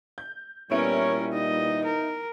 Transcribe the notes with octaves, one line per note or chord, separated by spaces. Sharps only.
G6
A#2 G3 B3 C#4 E4 A#4 C#5 D7
D#4 D#5
A#4